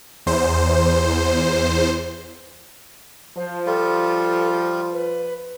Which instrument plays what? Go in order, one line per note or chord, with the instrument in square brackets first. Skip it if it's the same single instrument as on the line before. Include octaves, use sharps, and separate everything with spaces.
[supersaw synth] E2 C5
[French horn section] F3 [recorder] C5
[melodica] G3 F4 [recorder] A4
[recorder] B4